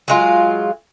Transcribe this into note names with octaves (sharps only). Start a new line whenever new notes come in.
F#3 G#3 F4